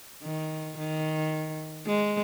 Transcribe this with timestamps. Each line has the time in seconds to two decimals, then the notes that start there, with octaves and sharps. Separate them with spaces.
0.24 D#3
0.77 D#3
1.87 G#3